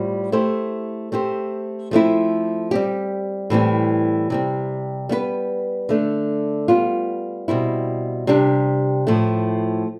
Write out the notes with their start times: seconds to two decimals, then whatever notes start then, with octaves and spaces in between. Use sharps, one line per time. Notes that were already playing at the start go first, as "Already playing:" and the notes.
Already playing: A2 G3 C4 F4 C5
0.32 A3 E4 G4 C5
1.12 A3 C4 G4 C5
1.91 F3 A3 C4 E4
2.71 G3 C4 G4
3.50 A2 E3 G3 C4
4.30 C3 G3 C4
5.09 G3 B3 E4 B4
5.89 D3 A3 D4
6.68 G3 B3 F4
7.48 B2 G3 C4 E4
8.27 C3 G3 D4 G4
9.07 A2 F3 A3